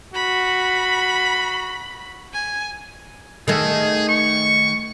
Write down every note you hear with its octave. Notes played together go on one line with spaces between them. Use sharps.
F#4 B5
G#5
D#3 A3 G#4
C#6